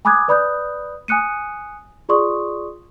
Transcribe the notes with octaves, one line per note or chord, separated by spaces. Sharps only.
G#5 B5 D6 D#6 F#6 G#6
B4 D5 B5 D#6 F#6 G6
G#5 D#6 F#6 C#7 D#7
F4 G#4 D5 C6 C#6 D#6